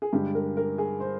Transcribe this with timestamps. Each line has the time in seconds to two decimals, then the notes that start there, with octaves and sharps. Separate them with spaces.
0.02 G#4
0.13 G2 D3 G#3 G4
0.35 A#4
0.57 A#4
0.78 G#4
1.00 C5